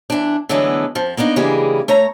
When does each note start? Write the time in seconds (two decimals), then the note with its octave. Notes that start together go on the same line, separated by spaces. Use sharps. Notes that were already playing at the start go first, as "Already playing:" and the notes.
0.10 E3 D4
0.49 D3 E3 F#3 G#3 A3 B3
0.95 F2 F3
1.17 A#3 B3 D4 D#4
1.36 C#3 E3 G3 G#3 A#3 G#4
1.88 A3 C#5 A#5